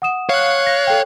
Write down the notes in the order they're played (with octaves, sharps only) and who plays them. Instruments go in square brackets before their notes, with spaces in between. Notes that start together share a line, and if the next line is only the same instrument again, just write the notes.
[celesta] F#5 D#6 E7
[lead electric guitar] C#5 [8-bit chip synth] F5 F#6
[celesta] A#6
A4 G5